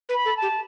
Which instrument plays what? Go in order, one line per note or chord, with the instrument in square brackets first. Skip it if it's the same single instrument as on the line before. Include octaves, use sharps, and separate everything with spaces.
[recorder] B4
[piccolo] B5
[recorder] A4
[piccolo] A5
[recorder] G4